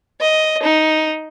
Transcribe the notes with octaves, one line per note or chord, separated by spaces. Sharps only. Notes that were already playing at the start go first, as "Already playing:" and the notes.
D#5
D#4